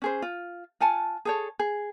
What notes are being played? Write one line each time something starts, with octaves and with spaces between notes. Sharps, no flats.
C#4 G#4 C5
F4
F4 F#5 G#5 A5
G#4 A4 C#5
G#4